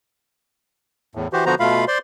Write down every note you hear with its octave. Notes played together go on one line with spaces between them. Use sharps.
E2 A2
E3 F#4 G4 C5
D3 F3 B3 F#4 C5 A#5
B2 A3 F4 F5 B5
C5 D5 C6